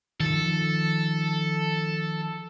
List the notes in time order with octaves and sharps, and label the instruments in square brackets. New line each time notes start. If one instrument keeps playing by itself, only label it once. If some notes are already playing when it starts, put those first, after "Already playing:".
[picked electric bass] D#3 F3 [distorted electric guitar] A4